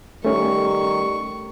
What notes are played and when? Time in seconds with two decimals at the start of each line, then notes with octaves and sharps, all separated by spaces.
0.25 D#3 G3 A3 C#4 C#6